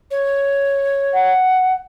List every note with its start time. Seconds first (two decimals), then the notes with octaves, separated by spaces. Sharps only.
0.11 C#5
1.13 F#5